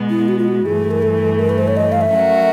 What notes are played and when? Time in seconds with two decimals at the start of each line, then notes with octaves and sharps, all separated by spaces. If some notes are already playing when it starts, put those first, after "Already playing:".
Already playing: B2 G#3 B3
0.10 E4
0.28 F#4
0.38 F4
0.48 F#4
0.66 G2 E3 A3 G#4
0.91 A#4
1.02 A4
1.39 A#4
1.49 B4
1.58 C5
1.68 C#5
1.77 D#5
1.92 F5
2.01 E5
2.13 F#3 A3 C#4 F#4 A#4